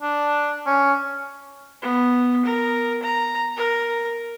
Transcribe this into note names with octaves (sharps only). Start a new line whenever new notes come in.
D4
C#4
B3
A#4
A#5
A#4